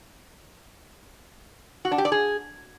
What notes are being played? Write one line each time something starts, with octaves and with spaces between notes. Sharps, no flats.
F#4
D4
G4
D5
G#4